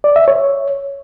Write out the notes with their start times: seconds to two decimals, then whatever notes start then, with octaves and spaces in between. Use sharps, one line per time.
0.04 D5
0.16 E5
0.28 C#5